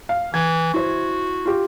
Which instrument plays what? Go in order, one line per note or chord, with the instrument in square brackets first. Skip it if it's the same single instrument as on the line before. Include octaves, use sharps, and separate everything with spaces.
[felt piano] F5
[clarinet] E3 [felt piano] G#6
[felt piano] E4 C5 [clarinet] F#4
[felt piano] F4 G4